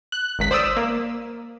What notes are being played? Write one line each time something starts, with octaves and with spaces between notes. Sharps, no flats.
F#6
G#1 C#2 B6
C5 D5 D#6 E6
A#3